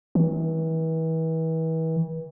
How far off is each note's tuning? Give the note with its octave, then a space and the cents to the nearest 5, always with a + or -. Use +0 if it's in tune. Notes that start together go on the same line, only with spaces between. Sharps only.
E3 -35